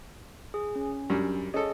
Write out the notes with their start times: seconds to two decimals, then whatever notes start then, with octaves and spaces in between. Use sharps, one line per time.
0.54 G#4
0.76 C#4
1.10 F#2 G3 D4
1.54 C#4 G#4 A4 D#5